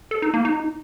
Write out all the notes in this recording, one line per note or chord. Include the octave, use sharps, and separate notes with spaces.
A4
D#4
A#3
D#4